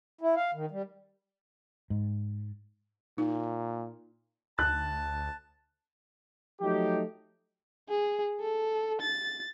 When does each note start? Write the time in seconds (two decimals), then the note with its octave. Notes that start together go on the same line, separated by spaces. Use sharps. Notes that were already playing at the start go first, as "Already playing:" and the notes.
0.21 E4
0.36 F5
0.54 D#3
0.71 G3
1.90 G#2
3.18 A#2 D#4
4.59 D2 A5 F#6
6.60 F3 F#3 A3 D#4 G4
7.89 G#4
8.40 A4
9.02 A6